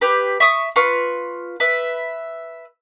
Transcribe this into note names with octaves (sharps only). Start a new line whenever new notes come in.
G4 B4
E5 C#6 D#6
F4 B4 C#6
B4 E5